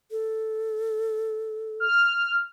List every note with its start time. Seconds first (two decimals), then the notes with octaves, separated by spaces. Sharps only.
0.11 A4
1.80 F6